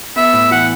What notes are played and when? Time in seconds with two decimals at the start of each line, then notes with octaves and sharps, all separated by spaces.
0.16 B3 E5
0.33 A2
0.51 E3 F#5